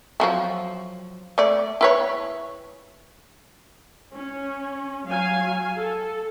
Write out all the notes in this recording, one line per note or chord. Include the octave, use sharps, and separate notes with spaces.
F3 F#3 A3
A3 D5
E4 B4 C#5
C#4
F#3 F5 G#5
A4